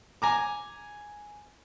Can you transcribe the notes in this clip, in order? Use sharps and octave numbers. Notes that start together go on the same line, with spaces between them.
G#5 A#5 D6